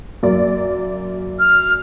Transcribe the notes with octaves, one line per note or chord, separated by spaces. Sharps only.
F#2 A#3 D5
F6